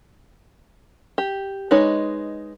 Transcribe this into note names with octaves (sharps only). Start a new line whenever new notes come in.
G4
G#3 D#4 B4 C#5